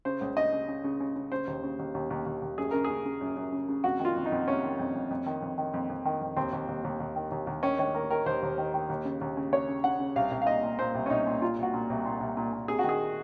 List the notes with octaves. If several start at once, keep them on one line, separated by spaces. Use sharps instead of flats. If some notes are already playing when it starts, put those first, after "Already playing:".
C#3 C5
C#2
C#3 D#5
C#3
C#3
C#3
C#3
C#3
C#3 C5
D#2
C#3
D#2
D#2
D#2
D#2
D#2
F#2 G#4
C#3 A#4
G#4
C#3
C#3
F#2
F#2
C#3
C#3
F2 F#4
D#3
F4
F2
D#4
F2
C3 C#4
D#3
F2
F2
F2
D#3
F2
D#3
F2
F2
D#3
F2
D#2 C4
D#2
D#2
D#2
D#2
D#3
D#2
D#2
D#3 C#4
D#3 C#4
D#3 A#4
D#3 A#4
D#2 C5
D#2
D#3
D#3
D#2
C#3
D#2
C#3
C#3 C#5
C#3
C#3 F#5
C#3
C2 F5
C2
F5
A#2 D#5
A#2
A#2 C5
C2
C#4
C2 D#4
A#2
A#2 F4
C2 F#4
A#2
C2
A#2
C2
A#2
A#2
C3 G#4
F#4
D#3 G#4